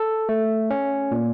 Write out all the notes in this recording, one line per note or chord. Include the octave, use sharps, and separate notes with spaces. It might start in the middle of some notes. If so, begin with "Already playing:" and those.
Already playing: A4
A3
C#4
A#2